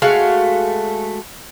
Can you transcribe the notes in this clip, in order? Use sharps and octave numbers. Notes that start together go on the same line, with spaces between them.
G#3 A3 F#4 F5